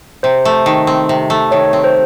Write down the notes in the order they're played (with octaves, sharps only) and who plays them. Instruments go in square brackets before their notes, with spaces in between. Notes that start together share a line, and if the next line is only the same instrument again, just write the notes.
[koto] C3 [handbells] C5
[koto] A3
D#3
C4
C3
A3
[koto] D#3 [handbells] C#5
[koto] C4
[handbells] C5